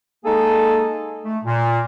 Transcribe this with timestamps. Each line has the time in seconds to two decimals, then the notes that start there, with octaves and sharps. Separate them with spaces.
0.24 G#3 A#3 D#4 G#4 A4
1.25 A3
1.44 A#2